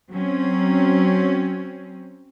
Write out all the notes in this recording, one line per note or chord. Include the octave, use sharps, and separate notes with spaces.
F#3 C4 C#4